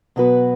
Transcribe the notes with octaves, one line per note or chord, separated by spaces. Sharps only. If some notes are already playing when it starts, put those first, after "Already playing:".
B2 F#3 B3 F#4 B4